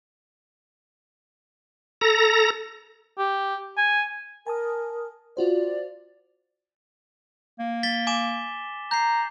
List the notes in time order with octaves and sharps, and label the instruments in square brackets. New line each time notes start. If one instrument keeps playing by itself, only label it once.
[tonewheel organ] A4 A#5 A#6
[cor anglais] G4
G#5
[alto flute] A#4 [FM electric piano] G#5 A5 D#6
[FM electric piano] F4 F#4 C5 [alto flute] D5
[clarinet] A#3
[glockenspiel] A6 B6 G7
G#5 D6 E7
[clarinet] A#5 [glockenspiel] G6 C7